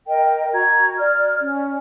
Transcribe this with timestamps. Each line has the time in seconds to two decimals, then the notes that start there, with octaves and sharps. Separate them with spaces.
0.07 A#4 D#5 G5
0.53 F#4 A#5 G#6
0.98 D5 F6
1.41 C#4